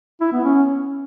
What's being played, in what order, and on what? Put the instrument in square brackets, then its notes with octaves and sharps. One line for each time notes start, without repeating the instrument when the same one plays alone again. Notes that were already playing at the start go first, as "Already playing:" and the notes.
[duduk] E4
B3
C#4